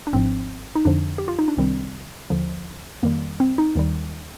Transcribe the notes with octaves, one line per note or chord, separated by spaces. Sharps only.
D4
G#1 G#2 F3 C4
D#4
F2 D3 F3 D4
G4
F4
D#4
D4
C2 C3 D#3 G3 C4
D#2 D3 F3
F2 D#3 G3 A#3
C4
D#4
D#2 D#3 G3